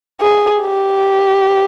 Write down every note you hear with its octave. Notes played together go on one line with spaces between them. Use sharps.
G#4
G4